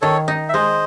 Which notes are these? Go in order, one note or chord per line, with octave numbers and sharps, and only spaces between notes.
D#3 A4 C#5
D#4
E5
G#3 C5 D#5